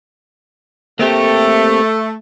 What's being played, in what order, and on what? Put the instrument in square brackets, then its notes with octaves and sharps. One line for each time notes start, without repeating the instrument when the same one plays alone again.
[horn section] A3 [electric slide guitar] A#3 C4 G4